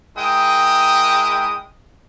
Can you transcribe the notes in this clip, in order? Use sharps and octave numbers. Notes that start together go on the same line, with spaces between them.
G#3 E4 A#4 G5 D#6